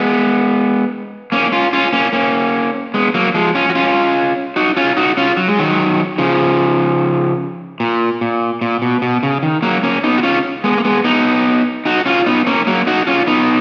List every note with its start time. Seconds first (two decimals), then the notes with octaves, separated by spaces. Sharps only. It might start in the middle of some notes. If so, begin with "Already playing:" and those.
Already playing: G#3 B3
1.32 A#3 C#4
1.52 C#4 F4
1.73 C#4 F4
1.93 A#3 C#4
2.13 A#3 C#4
2.94 G#3 B3
3.14 F#3 A#3
3.35 F3 G#3
3.55 C#4 F4
3.69 F#4
3.75 C#4 F4
4.56 D#4 F#4
4.77 C#4 F4
4.97 D#4 F#4
5.17 C#4 F4
5.37 F#3
5.48 G#3
5.59 D#3 F#3
6.18 C#3 F3
7.80 A#2
8.21 A#2
8.61 A#2
8.82 B2
9.02 B2
9.23 C#3
9.43 D#3
9.62 F#3 A#3
9.83 A#3 C#4
10.04 B3 D#4
10.18 F#4
10.23 C#4 F4
10.64 G#3 B3
10.78 A#3
10.85 G#3 B3
11.04 B3 D#4
11.85 D#4 F#4
12.06 C#4 F4
12.26 B3 D#4
12.47 A#3 C#4
12.67 F#3 A#3
12.87 D#4 F#4
13.07 C#4 F4
13.27 B3 D#4